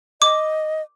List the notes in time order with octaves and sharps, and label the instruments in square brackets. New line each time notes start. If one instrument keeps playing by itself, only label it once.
[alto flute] D#5 [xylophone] D6